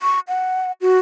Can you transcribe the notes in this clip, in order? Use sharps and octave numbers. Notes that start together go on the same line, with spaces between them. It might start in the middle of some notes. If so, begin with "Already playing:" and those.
C#6
F#5
F#4